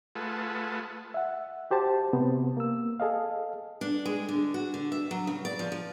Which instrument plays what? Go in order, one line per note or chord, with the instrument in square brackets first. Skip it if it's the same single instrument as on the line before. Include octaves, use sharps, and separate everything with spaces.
[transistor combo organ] A3 F4 G#4 A4 B4 F#5
[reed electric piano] E5 F#5
F#4 G4 C5 A5
C3 B3
A#3 E6
G#4 A4 D#5 F5
[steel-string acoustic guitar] D4
G#3
D3
F#4
D3
E5
F#3
C#3
D5
F3
F3